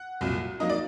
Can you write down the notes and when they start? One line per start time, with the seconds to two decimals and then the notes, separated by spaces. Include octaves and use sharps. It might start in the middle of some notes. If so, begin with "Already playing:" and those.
Already playing: F#5
0.21 C2 A#2 F#3
0.60 F#3 A#3 D#4 D#5
0.70 D5